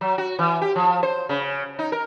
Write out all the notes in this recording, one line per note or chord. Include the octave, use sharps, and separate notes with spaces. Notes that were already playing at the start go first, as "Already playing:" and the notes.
F#3
F#4
E3
G4
F3
C5
C#3
D#4
A#4